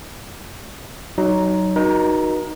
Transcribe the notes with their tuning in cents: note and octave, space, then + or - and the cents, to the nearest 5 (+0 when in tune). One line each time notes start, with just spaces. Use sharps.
F#3 +25 D#4 +0
D#4 +0 F#4 +0 A#4 +40